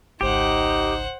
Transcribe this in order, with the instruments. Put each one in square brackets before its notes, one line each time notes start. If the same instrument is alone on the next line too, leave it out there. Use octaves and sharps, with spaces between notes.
[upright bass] G#1 C#2 [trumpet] D#4 [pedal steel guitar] G4 [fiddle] C5 F#5